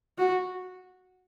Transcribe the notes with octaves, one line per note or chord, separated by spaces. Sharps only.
F#4